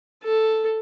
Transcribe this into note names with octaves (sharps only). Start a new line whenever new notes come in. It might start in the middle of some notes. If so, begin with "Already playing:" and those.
A4